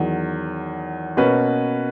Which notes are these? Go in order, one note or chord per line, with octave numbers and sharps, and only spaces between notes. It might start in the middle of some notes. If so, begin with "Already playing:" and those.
Already playing: E2 D#3 F#3
B2 A#3 C#4 F#4 B4